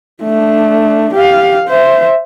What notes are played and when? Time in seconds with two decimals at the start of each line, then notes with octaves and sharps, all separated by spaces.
0.22 A3 D4
1.14 G4 F5
1.68 C5 E5